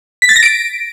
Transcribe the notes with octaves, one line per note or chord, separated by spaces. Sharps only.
B6
A6
A#6
D7